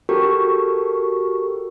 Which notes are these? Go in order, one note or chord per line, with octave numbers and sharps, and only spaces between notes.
F#4 G4 A4 A#4 C#6